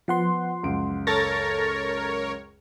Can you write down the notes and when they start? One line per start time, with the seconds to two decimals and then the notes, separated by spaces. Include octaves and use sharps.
0.08 F3 B3 F#5 C6
0.63 C#2 F#2 D7
1.07 A4 A#4 C#5 A6 A#6